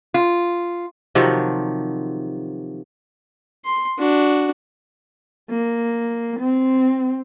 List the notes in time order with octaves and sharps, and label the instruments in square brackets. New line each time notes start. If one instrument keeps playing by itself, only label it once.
[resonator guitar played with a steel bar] F4
[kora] C3 D#3 F3 F#3
[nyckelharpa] C6
D4 F#4
[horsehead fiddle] A#3
C4